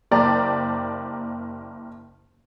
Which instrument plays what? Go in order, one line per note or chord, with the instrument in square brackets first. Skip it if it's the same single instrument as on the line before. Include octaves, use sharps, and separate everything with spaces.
[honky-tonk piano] F#1 A#3 G4 D5 A5 A#5